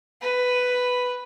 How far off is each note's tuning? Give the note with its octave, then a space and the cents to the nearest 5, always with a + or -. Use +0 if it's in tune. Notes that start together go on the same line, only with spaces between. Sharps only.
B4 +5